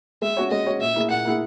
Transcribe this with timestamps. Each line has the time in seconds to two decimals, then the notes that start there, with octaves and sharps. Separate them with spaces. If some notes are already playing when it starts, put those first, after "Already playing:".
0.22 G#3 E5
0.37 C#4 F#4 C#5
0.51 G#3 D#5
0.66 C#4 F#4 C#5
0.81 A#2 E5
0.96 A#3 E4 G#4
1.10 A#2 F#5
1.25 A#3 E4 G#4